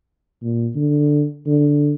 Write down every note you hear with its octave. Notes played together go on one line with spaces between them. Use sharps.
A#2
D3
D3